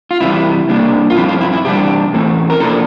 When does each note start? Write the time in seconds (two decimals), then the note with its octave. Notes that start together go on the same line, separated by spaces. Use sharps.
0.11 F4
0.21 C3 E3 G3 E4
0.69 C3 G3 A#3 D4
1.10 F4
1.16 G2 F3 C4 E4
1.28 F4
1.41 E4
1.53 E4
1.64 E2 C3 G3 D4 G4
2.13 A2 E3 A3 C4
2.50 A#4
2.60 C3 F3 A#3 D4 A4